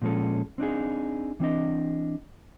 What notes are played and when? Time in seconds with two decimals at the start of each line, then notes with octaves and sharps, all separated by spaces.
0.02 A#2 F3 G#3 C#4 A4
0.58 C4 D4 D#4 G#4
1.40 E3 C4 D4 D#5